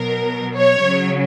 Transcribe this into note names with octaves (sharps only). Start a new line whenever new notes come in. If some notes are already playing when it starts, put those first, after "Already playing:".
Already playing: B2 F#3 A#4
C#5
C#3 F#3